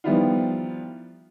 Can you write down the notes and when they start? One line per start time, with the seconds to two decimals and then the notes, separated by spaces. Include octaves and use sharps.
0.04 D#3 F3 G3 B3 E4 F4